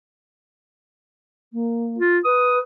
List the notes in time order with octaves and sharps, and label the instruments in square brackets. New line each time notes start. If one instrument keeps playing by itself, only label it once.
[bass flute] A#3
[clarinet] F4
[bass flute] B4 [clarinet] D#6